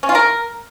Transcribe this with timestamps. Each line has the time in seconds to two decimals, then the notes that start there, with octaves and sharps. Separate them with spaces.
0.03 C#4
0.09 F4
0.15 A#4